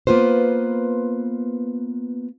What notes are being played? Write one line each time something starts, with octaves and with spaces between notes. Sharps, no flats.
A#3 B3 F4 B4 C5